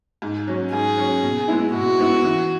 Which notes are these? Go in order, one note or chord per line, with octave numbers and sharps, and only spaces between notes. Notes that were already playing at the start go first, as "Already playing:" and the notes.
G#2
F#3 C#4
G#2 G#4
F#3 C#4
B2
G#3 B3 E4
B2 F#4
G#3 B3 E4
E3